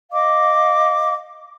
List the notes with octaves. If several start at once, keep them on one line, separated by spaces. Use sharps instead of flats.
D#5 F5 D6